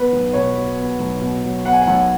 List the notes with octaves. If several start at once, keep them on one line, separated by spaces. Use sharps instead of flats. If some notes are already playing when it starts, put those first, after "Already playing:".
Already playing: B3 B4
B1
B2 C#5
F#3
B3
B1
B2
F#3
B3 F#5
G#5
F#5
B1